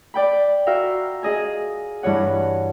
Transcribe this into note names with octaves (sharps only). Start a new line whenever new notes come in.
D5 G5 B5
F#4 A#4 E5 F5 G5
G#4 D#5 G#5
G2 E3 C#5 F#5